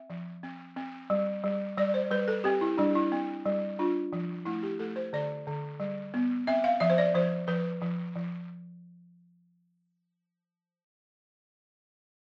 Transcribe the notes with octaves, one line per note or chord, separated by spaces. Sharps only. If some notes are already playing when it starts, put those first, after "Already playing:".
Already playing: C4 E5
F3
C4
C4
G3
G3
G3 D5
C5
G3 B4
A4
C4 G4
E4
G3 D4
E4
C4
G3
D4 F4
F3
A3 E4
G4
A3 A4
C5
D3 D5
D3
G3
B3
C4 E5
F5
F3 E5
C5
D5
F3 C5
F3 B4
F3
F3